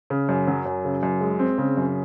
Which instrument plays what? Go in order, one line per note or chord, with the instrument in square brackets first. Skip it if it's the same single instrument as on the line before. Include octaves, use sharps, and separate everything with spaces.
[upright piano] C#3
F#2
F#3
F#2
C#3
F#2
G#3
C4
C#3
F#2